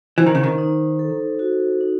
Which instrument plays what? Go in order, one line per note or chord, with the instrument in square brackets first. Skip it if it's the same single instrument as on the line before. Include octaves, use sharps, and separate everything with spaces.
[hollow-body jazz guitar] E3 [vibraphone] C5
[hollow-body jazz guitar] D#3
C#3
D#3
[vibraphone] D#4
A4
F#4
D#4